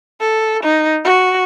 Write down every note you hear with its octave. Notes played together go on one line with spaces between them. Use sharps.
A4
D#4
F#4